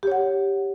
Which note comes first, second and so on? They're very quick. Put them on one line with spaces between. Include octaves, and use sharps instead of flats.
G4 C#5 F#5